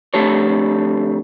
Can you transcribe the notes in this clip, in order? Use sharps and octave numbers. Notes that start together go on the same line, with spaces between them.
F2 D3 A3 G4 A4 C#5